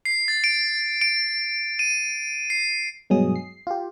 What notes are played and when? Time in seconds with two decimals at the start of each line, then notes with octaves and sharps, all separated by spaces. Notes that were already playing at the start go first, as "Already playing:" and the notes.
0.05 C7
0.28 A6
0.44 D7
1.01 D7
1.79 D#7
2.50 C7
3.10 G2 B2 F#3 G#3 G#4 D#6
3.36 C7
3.67 F4 G4